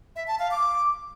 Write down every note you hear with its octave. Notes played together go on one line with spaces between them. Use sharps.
E5
A5
F5
D6